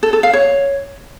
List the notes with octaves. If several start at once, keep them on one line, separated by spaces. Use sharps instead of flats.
A4
A4
F5
C#5